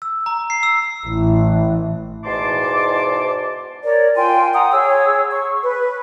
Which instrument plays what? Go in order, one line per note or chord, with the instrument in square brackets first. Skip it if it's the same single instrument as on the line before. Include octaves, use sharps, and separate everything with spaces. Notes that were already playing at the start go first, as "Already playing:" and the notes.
[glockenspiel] E6
A#5
C7
E6
[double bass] A1 E3
[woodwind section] E2 G#2 B2 A5 C6 D6
[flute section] A#4 C#5 D5
F4 G5 G#5 C6
F#5 A#5 D#6
G#4 C#5 E6
C#6
B4